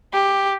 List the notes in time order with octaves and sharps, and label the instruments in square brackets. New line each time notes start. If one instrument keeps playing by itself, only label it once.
[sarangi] G4